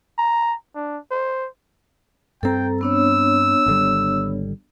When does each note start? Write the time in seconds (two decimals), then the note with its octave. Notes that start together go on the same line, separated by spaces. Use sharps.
0.18 A#5
0.75 D4
1.11 C5
2.43 G2 C4 A4 G5 A#5
2.81 B3 D4 C#5 E6
3.66 G#1 D3 G3